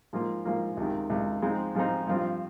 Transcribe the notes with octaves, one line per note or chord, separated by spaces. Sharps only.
G#2 F3 A#3 F4
G#2 F3 A#3 F4
C#2 C3 D#3
C#2 C3 D#3
G#2 F3 G#3 C4 D#4
G#2 F3 G#3 C4 D#4
G2 F3 C4 F4